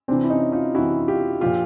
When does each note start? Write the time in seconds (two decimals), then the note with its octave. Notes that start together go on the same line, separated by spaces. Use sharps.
0.08 C3 E3 C4 D4
0.24 E4
0.30 C#4 D#4
0.52 D#4 F4
0.75 C3 E3 E4 F#4
1.08 F4 G4
1.41 A#2 F3 F4 G4